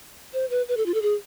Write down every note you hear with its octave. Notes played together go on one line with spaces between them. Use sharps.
C5
B4
B4
A4
F4
A4
G#4